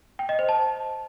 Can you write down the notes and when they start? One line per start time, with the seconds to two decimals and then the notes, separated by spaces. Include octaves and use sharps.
0.19 G5
0.29 D#5
0.39 C5
0.49 A5